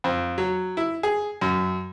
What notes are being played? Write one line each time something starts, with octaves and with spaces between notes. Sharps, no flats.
F2
F#3
E4
G#4
F#2